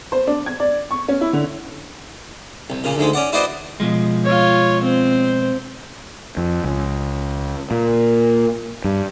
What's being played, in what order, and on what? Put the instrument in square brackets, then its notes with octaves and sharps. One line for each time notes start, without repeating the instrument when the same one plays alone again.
[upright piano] C5
D4
G#6
D5
C#6
C#4
E4
D3
[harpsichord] C2
A#2 C#3
D2 G#2 G#3
C#4 D5 F#5
E4 F#4 B4 C5 D5 D#5
[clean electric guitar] B2 F3 G#3
[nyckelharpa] F4 C#5
C4 C5
[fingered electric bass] F2
C#2
A#2
G2